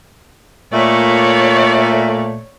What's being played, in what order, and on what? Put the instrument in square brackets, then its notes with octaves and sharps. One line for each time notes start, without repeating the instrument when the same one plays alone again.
[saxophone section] A#2 A3 [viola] C#5 D5